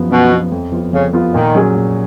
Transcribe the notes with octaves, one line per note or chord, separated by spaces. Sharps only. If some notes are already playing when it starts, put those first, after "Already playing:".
Already playing: F#2 F3 B3
F#2 B2
F3 B3
F2
F3 B3 F4
F2 C#3
F3 B3 F4
A#2 D#3
F#3 C#4 G#4
A#2